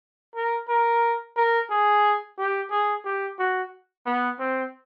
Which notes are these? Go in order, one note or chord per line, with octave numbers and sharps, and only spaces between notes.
A#4
A#4
A#4
G#4
G4
G#4
G4
F#4
B3
C4